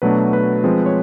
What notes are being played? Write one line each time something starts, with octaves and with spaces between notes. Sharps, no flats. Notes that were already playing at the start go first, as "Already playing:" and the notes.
B2 F#3 A3 D4 B4
B4
F3 G#3 C4
C#5